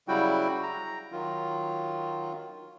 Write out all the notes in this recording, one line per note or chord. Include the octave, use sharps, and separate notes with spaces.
C#3 F#3 G3 E4 F#4 G5
A#5
D#3 F#3 F4